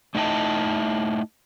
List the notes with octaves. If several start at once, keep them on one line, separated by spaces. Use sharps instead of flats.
A3 D#4 E4 D#5 G5 A5